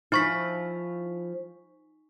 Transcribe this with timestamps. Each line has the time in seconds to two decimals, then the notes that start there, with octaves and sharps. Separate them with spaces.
0.12 F3 D#4 E4 C#6 B6